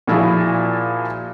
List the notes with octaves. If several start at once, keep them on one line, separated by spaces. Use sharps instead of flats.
A#2 F3 E4 F#4 G#4